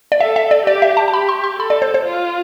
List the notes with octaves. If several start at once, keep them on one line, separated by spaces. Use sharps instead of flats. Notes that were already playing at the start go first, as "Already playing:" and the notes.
D5
A4 E5
E5
D5
G4 D5
E5
A5
A5
G4 B5
C6
C6
A4 B5
D5
C5
C5
F4